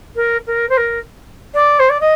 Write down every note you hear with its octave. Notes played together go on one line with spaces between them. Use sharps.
A#4
A#4
C5
A#4
D5
C5
D5
D#5